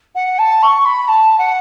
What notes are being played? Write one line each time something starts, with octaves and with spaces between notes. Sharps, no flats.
F#5
A5
C#6
B5
A5
F#5